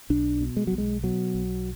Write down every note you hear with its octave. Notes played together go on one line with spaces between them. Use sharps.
B1 D4
B2
G#3
B1 F#3
G#3
B2 F#3
B1